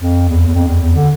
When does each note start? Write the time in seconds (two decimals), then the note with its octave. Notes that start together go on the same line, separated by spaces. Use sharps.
0.02 F2
0.29 E2
0.47 E2
0.55 F2
0.68 E2
0.82 E2
0.95 D3